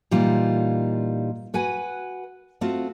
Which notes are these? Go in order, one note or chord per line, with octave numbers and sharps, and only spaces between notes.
A#2 E3 G3 D#4 F4
F#4 B4 F#5 G#5
A3 C4 F4 F#4